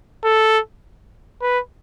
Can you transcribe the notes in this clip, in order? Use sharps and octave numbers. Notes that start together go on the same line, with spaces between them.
A4
B4